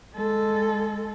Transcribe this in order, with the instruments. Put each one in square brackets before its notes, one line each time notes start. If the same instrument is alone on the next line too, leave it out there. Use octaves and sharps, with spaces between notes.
[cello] G#3 A4